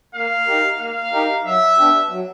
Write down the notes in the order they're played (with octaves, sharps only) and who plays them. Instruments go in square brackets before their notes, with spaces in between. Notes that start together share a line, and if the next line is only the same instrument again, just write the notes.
[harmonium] A#3 [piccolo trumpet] F5
[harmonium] D#4 G4 A#4
[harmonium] A#3 [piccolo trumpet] F5
[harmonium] D#4 G4 A#4
[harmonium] F#3 [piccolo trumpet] E5
[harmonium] B3 D4 G4
F#3